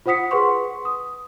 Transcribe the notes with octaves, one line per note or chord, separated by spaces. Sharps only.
F4 C5 F#5 D#6 B6 C#7
G#4 B4 F#5 C6 C#6
D#6